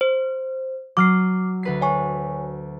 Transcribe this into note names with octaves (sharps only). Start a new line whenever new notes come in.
C5
F#3 D6 F6 C7
D2 B4 C7
C#5 G#5 C#6